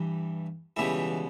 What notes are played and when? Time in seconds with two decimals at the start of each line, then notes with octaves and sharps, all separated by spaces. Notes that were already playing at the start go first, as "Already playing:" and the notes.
Already playing: G2 E3 G3
0.77 C#2 B2 E3 G3 E4